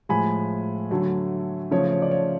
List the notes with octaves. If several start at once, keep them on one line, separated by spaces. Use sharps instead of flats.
A2 F3 G#3 G#5 B5
D3 F#3 A3
C#3 F3 A3 C#5
C#5
D5
C#5